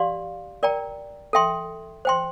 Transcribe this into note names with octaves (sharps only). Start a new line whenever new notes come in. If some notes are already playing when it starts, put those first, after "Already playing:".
Already playing: G4 D5 F5 C6
A#4 D5 G5 A#5
A4 E5 G5 C6
C5 G5 C6